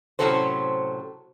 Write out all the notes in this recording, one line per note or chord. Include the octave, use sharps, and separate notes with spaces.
A2 C3 F#3 C#4 A4 C5